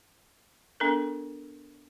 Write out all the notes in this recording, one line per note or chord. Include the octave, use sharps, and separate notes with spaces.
B3 D4 A4 A#4